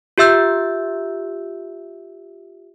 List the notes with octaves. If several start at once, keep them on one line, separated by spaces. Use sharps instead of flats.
F4 G4 E5 E6 G6